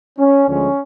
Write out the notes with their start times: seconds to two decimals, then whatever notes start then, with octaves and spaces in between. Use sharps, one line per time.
0.18 C#4
0.48 D2 D3 F3 G#3 C#4